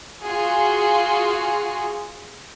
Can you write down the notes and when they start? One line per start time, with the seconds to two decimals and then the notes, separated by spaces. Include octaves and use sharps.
0.23 F4 F#4 G#4